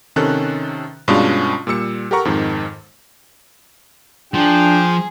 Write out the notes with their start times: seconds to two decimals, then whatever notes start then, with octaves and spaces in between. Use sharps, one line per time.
0.16 C3 D#3 C#4 A4 F#6
1.08 G2 B2 G#3 C#4 D4 F4
1.67 A#2 G3 E6 C#7
2.11 G4 A4 A#4 F#5 A#5 C#6
2.25 F2 G#2 D#3
4.34 F3 D4 G#4 G5